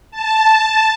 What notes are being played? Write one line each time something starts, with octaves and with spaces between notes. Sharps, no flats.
A5